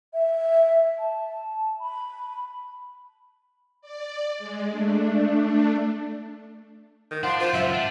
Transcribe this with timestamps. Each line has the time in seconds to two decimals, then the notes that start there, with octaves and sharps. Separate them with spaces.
0.13 E5
0.98 A5
1.79 B5
3.82 D5
4.38 G#3
4.69 A3 D4
7.11 D#3
7.23 F3 D4 F#5 C6
7.40 F4 C5
7.54 C#2 F#2 E5
7.74 D4